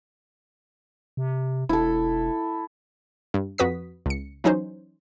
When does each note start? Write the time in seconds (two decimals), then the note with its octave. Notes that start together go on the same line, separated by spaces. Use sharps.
1.17 C3
1.69 E1 E4 A4
3.34 G2
3.58 F2 F#4 B4 D#6 B6
4.06 C#2 C#7
4.44 E3 F#3 C#4 D#4 C5